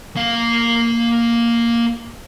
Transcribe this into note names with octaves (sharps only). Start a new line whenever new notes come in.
A#3 F5